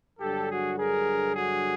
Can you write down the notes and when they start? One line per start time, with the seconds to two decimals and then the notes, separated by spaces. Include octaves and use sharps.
0.19 G2 D3 F#3 G4 A4
0.48 F#4 G#4
0.77 G#4 A#4
1.34 F#4 G#4